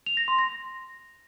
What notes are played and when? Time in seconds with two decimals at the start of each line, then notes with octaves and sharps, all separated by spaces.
0.06 F7
0.17 A#6
0.28 C6
0.39 A#6